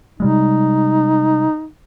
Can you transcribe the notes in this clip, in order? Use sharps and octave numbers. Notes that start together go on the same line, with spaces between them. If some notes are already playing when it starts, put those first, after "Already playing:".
C3 G3 G#3 D#4